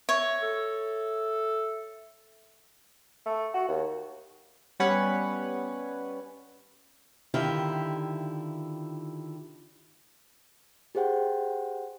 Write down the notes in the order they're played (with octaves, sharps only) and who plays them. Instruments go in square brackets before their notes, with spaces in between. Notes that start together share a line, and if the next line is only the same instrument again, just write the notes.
[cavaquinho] C#5 [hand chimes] E5
[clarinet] A4
[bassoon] A3
F#4
D#2
[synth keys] G3 B3 C#4 B4 C#5 F#5
[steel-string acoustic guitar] D3 D#3 E4 F4 G4
[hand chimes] G4 G#4 C5 F#5 G5